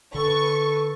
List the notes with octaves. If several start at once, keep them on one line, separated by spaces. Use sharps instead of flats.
D3 A4 B4 C#6